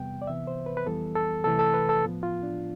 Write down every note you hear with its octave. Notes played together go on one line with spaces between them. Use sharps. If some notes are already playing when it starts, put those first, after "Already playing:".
Already playing: E2 C3 G3 B3 G5
D5
C2 C3 E3 B3 E5
C5
B4
B4
F2 E3 G3 B3 A4
A4
C2 C3 E3 A3 A4
A4
B4
A4
A2 F3 B3
F4
D4